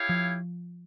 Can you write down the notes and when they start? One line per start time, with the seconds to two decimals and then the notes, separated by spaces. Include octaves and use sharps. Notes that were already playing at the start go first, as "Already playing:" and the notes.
Already playing: E4 G4 C#5 F5
0.09 F3